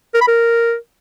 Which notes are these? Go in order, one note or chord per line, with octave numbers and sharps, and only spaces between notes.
A#4
B5
A#4